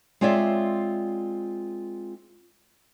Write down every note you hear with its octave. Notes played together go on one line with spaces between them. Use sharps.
G#3 C4 F4 C#5 D5 E5